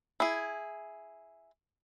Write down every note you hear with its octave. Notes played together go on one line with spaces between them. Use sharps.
E4 G#4